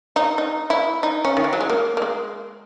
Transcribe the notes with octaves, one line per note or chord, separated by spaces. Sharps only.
D#4
D#4
E4
D#4
C#4
D#3
E3
F#3
G#3
A#3
A#3
G#3